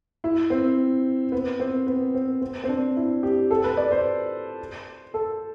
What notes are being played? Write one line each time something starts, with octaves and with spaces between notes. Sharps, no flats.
E4
C4
B3
C4
B3
C4
C4
C4
D4
E4
G4
A4
B4
D5
C5
A4